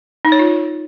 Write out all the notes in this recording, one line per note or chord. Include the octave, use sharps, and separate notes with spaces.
D#4
C#5
F4